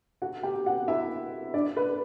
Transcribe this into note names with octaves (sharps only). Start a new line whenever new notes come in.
F#4 F#5
G4 G5
F#4 F#5
E4 E5
D4 D5
B4